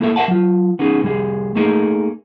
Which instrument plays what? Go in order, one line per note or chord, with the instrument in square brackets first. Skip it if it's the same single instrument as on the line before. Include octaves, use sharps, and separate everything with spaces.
[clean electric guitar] A#3 E4 A4 A#4 D#5 E5
A#4 C#5 E5 F#5 A5
F#3 F4
B3 C#4 D#4 G#4
C2 G3 G#4
A3 A#3 D#4 G#4 A#4